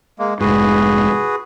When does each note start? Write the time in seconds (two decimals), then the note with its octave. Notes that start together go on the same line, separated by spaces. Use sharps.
0.19 G#3 A#3
0.41 F1 G#2 F#4 G#4 B4